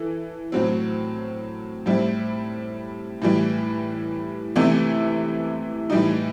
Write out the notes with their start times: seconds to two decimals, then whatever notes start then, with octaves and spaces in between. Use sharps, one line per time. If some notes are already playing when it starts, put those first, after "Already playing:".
Already playing: E3 A4
0.52 A2 F#3 C4
1.86 A2 G3 C4 E4
3.22 A2 E3 G3
4.56 C3 E3 A3 E4
5.90 A2 E3 G3 D#4